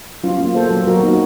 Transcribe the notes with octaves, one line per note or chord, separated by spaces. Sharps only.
F#3 C#4 F4
A#3
A#3 A4 C5
F#3
F#3 F#4 A#4
A#3 D#4 F#4